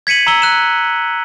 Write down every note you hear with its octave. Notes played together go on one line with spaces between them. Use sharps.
G#6 B6 C#7 D#7 F#7
A#5 E6 G7
F#6 E7